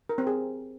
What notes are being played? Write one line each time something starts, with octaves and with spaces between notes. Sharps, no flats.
A#4
C4
G#4